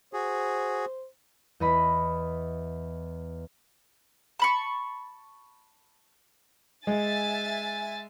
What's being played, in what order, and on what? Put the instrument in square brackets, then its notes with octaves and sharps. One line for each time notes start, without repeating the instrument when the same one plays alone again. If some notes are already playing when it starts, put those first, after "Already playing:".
[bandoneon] F#4 G#4 [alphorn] C5
[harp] E2 D#5 B5
[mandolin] A5 B5 C#6
[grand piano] G#3 [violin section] E5 G#5 A6